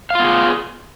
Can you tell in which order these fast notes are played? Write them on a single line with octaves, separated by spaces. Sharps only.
F5 F4 B3 G#4